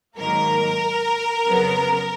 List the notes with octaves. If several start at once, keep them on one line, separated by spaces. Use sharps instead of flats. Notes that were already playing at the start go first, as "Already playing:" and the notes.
G#2 D#3 F#3 A#3 A#4
F2 C#3 F#3 B3